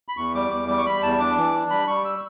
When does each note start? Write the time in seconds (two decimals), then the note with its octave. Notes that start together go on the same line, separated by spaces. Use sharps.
0.08 B5
0.17 E2 C#6
0.34 G3 D6
0.51 E2 D6
0.68 G3 D6
0.78 C#6
0.86 G3 B5
1.03 E2 A5
1.20 D4 D6
1.37 E3 D6
1.54 D4
1.70 G3 B5
1.87 G3 C#6
2.05 E6